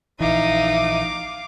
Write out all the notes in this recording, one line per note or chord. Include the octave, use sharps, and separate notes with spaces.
A#1 E3 D#4 E5 F5 D6 D#7